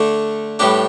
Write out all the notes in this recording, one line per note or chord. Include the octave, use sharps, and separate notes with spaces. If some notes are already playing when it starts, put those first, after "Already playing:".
Already playing: D3 A3 D4
A2 G3 B3 D4 G4